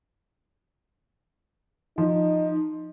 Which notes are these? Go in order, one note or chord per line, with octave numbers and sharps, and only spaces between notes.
F3 D#4